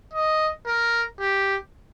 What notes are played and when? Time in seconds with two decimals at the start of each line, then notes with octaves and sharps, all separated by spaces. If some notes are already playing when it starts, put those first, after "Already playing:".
0.13 D#5
0.66 A#4
1.20 G4